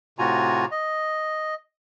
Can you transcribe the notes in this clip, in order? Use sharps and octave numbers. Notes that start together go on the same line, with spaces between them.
A2 C3 F4 F#4 G#5 A#5
D#5